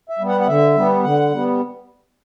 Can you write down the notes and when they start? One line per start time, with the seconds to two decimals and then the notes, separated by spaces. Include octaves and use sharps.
0.09 E5
0.19 G3 B3
0.29 F#5
0.41 F#5
0.48 D3 E5
0.76 G3 B3
1.04 D3 F#5
1.32 G3 B3